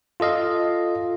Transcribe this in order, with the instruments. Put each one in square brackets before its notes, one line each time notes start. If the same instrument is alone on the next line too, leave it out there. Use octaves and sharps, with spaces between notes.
[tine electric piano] F4 A4 D#5 F5